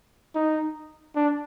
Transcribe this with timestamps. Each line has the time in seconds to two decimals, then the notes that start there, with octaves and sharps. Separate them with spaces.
0.35 D#4
1.15 D4